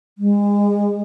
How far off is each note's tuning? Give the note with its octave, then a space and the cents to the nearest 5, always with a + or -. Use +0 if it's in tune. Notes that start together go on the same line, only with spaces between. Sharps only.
G#3 -30